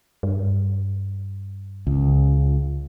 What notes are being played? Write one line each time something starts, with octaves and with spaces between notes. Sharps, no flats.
G2
C#2